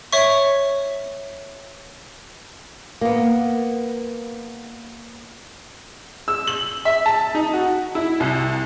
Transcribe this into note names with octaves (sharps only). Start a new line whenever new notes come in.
C#5 E5 C#6
A#3 B3
E6
F#7
E5
A5
D#4
F#4
E4
C2